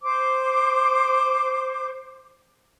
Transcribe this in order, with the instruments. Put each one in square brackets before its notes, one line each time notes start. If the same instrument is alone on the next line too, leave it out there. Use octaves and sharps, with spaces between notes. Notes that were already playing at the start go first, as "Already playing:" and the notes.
[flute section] C5 D6